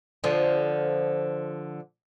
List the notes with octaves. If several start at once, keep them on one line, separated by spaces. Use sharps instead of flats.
D3 F3